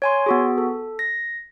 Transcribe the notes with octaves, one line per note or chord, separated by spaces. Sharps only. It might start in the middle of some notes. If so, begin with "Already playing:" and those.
C#5 G#5 C6
B3 F#4 G#4
A4
A#6